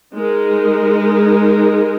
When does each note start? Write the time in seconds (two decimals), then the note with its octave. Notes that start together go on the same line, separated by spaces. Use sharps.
0.15 G#3 D#4 A#4